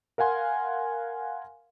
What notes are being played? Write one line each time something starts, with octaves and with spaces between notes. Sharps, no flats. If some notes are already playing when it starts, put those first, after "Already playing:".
A#4 F5 F#5 G#5 C6